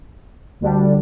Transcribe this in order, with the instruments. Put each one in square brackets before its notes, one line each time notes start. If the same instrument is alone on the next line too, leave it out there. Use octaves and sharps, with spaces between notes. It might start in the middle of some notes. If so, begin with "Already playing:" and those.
[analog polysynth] D2 D3 G3 D4